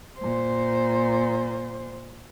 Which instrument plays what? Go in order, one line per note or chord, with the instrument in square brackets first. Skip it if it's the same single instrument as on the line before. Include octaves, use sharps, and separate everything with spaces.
[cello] A#2 C5